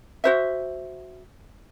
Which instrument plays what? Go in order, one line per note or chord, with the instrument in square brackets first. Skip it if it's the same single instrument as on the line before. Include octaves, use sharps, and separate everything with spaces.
[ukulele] F#4 C5 E5